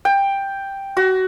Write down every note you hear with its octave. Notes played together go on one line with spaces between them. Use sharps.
G5
F#4